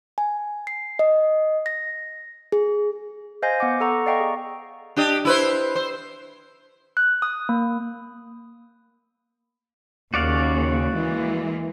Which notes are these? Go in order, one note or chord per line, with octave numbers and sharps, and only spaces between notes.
G#5
C7
D#5
A#6
G#4
C5 D#5 F5 G#5 G6 A#6
B3 F#5 D6
A4 F#5 A#5 C#6
D5 D#5 F5 G5 A#5 C#6
G#4
D4 G4 D#5
E4 B4 C5
C5
F#6
D#6
A#3
D#2 C#3 F#4 D5 F5
E3 G#3 A#3